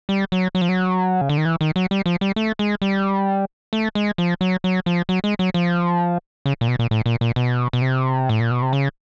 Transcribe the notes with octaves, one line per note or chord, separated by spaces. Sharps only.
G3
F#3
F#3
F3
F#3
C#3
D3
D#3
E3
D#3
F#3
G3
F3
G3
A3
G#3
G3
A3
G#3
F3
F#3
F#3
F3
F#3
G#3
F#3
F3
C#3
A#2
B2
A#2
A2
A#2
A#2
B2
B2
C3
A2
A#2
B2
C3
C#3